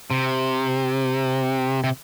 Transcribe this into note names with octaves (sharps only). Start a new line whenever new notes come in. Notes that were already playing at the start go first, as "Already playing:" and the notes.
C3
C3